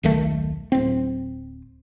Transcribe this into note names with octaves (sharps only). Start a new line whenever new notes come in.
D#1 B1 D#3 A3
D1 C4